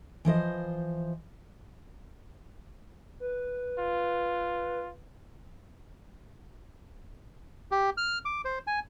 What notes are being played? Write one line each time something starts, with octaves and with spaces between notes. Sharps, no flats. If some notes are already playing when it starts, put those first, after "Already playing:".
E3 F3 C5 D#5
B4
F4
G4
F6
D6
C5
G#5